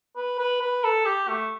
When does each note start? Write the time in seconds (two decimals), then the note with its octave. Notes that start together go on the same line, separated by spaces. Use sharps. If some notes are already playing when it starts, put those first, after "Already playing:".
0.17 B4
0.39 B4
0.62 B4
0.84 A4
1.06 G4
1.29 A3